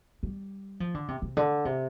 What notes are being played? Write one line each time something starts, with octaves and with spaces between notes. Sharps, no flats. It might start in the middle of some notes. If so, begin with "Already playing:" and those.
G3
F3
D3
C3
C3
D3
C3